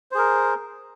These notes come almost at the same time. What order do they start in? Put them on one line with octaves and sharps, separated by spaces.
C5 G#4 A#4